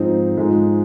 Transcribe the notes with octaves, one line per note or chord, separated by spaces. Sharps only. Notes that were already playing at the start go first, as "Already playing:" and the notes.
Already playing: G#2 F3 C4 D#4
G#2 F3 G#3 D#4